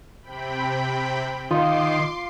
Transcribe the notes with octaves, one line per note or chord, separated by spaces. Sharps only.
C3 G5 B5
D#3 F4 C6 D6 C7